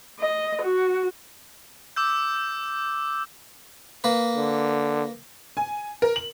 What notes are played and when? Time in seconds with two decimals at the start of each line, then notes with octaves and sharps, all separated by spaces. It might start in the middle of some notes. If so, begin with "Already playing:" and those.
0.20 D#5
0.63 F#4
1.96 D6 E6 G6
4.04 A#3 B4
4.36 D3
5.57 G#5
6.02 A#4
6.16 F#7